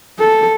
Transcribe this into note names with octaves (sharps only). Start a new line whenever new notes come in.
A4